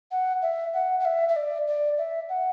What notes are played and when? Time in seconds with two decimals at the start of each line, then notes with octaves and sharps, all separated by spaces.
0.11 F#5
0.42 E5
0.74 F#5
1.00 F#5
1.05 E5
1.29 E5
1.36 D5
1.68 D5
1.98 E5
2.29 F#5